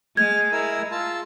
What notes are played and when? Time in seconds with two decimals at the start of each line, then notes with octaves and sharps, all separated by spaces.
0.17 G#3 F6 G#6
0.52 E4 A#4 E6
0.92 F4 A5 E6